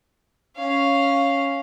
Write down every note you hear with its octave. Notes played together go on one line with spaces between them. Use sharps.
C#4 F5